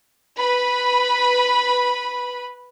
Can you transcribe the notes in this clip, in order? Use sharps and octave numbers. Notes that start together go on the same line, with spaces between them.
B4 B5